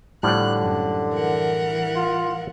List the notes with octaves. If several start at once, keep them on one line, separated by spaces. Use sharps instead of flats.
A2 D3 F3 G3 F#6
F#2
E3 A#4 F#5
F4